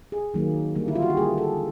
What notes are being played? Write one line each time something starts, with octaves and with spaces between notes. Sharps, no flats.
G#4
D#3 F#3 A#3
D3 G3 A#3
E4
F4
F#4
G4
D3 G3 A#3 G#4
A4